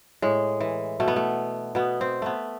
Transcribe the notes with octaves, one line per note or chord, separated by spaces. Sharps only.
A2 G#3
E3
B2 A3
B3
A3
B2 B3
C4
A3 B3